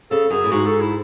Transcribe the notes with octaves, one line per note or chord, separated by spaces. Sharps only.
C#3 A4
F#2 G#4
A2
G#2 F#4
A4
E4